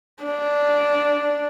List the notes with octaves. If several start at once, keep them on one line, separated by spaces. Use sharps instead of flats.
D4